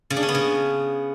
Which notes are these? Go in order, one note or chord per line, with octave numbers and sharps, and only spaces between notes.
C#3
D4
C#4
B3
C#3